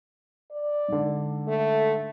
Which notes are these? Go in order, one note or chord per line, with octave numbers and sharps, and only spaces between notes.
D5
G#2 D3
A3